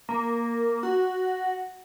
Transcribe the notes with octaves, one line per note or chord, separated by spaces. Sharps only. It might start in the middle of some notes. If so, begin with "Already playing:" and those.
A#3
F#4